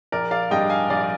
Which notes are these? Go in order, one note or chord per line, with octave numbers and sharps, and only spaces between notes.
A#1 A#4 D5
D5 F5
G#2 G3 D4 D#5 G5
F5 G#5
A#1 D5 F5